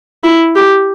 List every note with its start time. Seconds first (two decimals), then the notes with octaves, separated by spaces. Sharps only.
0.23 E4
0.56 G4